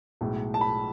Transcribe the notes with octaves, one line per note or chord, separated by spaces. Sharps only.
B1 A2 G#3
A5
B5